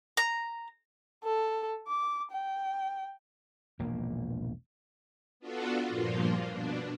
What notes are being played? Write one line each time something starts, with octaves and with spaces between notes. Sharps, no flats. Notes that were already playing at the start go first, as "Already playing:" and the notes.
A#5
A4
D6
G5
E1 A#1 A#3
B3 D4 F4 F#4 A4
G2 A#2 F3 A#3 F4
B2 D4